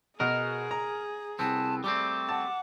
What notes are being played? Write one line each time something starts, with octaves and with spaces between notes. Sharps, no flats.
B2 F#4 G#4 A#4 D#5
A#5
C2 B3 C4 A5
G3 A3 C4 D6
F#5 A5